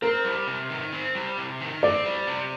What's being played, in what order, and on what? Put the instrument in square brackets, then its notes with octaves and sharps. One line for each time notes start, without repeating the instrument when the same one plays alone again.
[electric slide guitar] C4 [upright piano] A#4
[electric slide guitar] G3
C3
D#3
C4
G3
C3
D#3
[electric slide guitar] C4 [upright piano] D5
[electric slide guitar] G3
C3